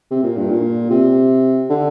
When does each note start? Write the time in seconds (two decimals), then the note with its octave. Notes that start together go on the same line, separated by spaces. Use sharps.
0.11 C3
0.23 A#2
0.37 G2
0.50 A#2
0.90 C3
1.70 D3